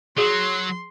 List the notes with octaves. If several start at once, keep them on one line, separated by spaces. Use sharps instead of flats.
F#3 G#4 C6